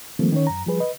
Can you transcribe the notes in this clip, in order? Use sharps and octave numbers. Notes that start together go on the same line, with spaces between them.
D#3 F3 G3 A3 A#3 C4
D#3 C#4 C#5
F#2 A#5
F3 G3 G#4 B4
B4 D#5